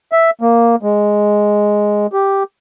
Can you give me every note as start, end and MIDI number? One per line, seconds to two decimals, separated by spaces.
0.12 0.30 76
0.41 0.76 58
0.83 2.07 56
2.13 2.43 67